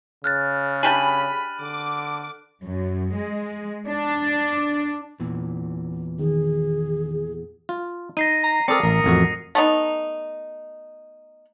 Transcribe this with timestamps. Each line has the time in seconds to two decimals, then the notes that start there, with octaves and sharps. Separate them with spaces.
0.24 C#3 F6 F#6 A6
0.83 D4 G4 G#4 B5 D#7 F#7
1.61 D3 D6
2.65 F#2
3.15 G#3
3.88 D4
5.20 E2 A#2 E3
6.19 D#3 G#4
7.69 F4
8.17 D#4 A#6 C7 D#7
8.44 A#5
8.68 C4 A4 A#4 D5 D#6 C#7
8.83 A1 A#4 A#5
9.04 A1 F2 F#4
9.55 A3 B3 D#4